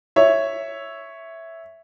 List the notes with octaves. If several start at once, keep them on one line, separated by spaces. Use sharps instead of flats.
C#5 E5